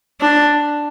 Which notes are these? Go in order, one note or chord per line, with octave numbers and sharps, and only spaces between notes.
D4